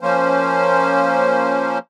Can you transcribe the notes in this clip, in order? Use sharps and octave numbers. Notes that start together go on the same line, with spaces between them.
F3 A#3 C#4 C5